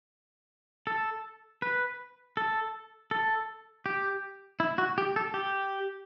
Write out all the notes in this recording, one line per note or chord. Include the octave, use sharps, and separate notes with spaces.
A4
B4
A4
A4
G4
E4
F#4
G4
A4
G4